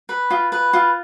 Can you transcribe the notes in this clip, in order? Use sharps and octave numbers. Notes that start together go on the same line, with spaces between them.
B4
F4
B4
F4